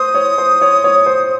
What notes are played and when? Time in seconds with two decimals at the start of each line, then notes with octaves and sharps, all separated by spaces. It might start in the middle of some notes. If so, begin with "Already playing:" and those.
Already playing: C5 D#6
0.15 C#5
0.38 C5
0.62 C#5
0.84 C#5
1.06 C5